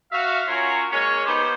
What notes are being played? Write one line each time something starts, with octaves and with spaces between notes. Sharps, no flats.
F#4 E5 F5
F#3 C#4 F4 A#4 C#5
G#3 A#3 C#4 C#5
B3 D#4 G4 C5